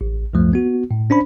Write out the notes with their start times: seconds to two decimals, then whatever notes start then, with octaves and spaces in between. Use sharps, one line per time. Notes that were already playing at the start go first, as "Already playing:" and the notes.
0.01 A1
0.33 C#2 F#2 F3 A3
0.53 B3 F#4
0.91 A2
1.10 C#4 D4 C5 B5